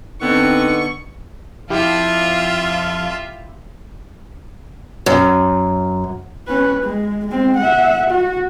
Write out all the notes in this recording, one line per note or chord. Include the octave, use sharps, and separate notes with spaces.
D3 B3 C4 D#4 C#6
F2 E4 F4 G4 E5 F5
F#2
C#4 B4
G#3
G#3 C4
E5 F#5
F#4